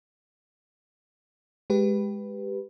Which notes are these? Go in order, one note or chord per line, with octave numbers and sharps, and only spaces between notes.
G#3 G4 B4